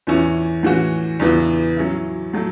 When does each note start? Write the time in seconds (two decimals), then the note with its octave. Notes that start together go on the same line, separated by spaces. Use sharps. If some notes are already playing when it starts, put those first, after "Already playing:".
0.07 E2 E3 C#4 E4
0.63 A2 E3 C#4 F#4
1.20 E2 C#3 E3 B3 E4
1.77 F#3 C#4 E4
2.34 A2 F#3 A3